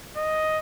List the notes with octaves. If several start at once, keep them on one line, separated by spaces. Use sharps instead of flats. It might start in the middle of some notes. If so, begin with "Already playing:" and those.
D#5